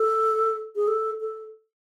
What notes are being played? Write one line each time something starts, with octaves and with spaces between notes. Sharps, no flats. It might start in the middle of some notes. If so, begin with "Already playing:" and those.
Already playing: A4
G#4
A4
A4